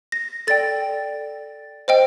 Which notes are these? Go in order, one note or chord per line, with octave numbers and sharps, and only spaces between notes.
A#6
A4 D5 G5 A6
C5 D#5 G5